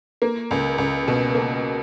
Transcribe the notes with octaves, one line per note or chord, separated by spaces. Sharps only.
A#3
C#2
C#2
B2
A#3